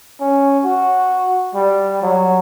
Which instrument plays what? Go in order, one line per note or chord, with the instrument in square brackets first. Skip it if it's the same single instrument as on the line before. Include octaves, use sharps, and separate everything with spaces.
[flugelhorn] C#4
F#4
G3
F#3